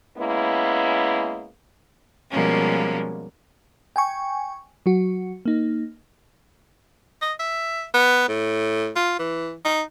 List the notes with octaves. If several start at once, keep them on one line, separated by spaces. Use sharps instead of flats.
G#3 A#3 B3 C#4 E4
B2 F3 G3 G#3 A#3 C#4
G5 G#5 C#6
F#3 F#4
A#3 D#4
D#5
E5
B3
A2
F4
E3
D#4